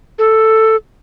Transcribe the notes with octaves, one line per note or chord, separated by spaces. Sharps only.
A4